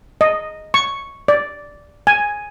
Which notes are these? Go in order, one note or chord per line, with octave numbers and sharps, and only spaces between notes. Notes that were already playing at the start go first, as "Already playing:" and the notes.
D#5
C#6
D5
G#5